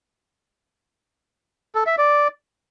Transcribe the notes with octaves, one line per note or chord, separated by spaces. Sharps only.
A4
E5
D5